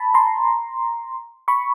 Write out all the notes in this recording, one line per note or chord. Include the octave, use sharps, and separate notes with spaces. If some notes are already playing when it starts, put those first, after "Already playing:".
Already playing: A5 B5
A#5 C6
B5 C#6